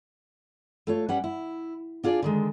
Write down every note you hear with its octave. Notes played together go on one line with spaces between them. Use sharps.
A3 F4 C#5
G3 C#4 B4 F#5
E4
D4 F4 G#4 D5
D3 D#3 G#3